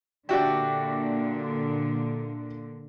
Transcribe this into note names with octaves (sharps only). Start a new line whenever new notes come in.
A#2 D3 D4 F#4 G4 D5 E5 G5